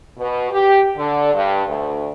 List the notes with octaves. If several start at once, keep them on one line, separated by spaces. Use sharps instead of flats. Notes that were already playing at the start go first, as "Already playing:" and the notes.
B2
G4
D3
G2
D2